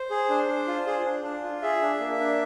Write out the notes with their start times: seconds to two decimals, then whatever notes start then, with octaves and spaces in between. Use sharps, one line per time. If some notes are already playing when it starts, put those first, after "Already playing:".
Already playing: C5
0.10 G#4
0.30 D4
0.48 D4
0.68 F4
0.87 G#4
1.05 D4
1.24 D4
1.44 F4
1.62 G#4 E5
1.82 D4
2.00 A#3
2.20 D4